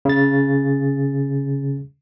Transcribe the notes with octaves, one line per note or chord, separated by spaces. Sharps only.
C#3 A6